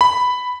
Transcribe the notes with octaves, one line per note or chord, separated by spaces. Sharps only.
B5